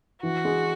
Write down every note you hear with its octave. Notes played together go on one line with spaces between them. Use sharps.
E3 F#4
G#3